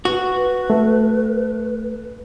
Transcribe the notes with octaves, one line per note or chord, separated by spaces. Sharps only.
F#4 B4
A3